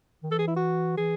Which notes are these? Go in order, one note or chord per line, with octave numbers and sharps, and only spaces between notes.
D#3
E3 A4
G#4
E4
F#4
E3 G#4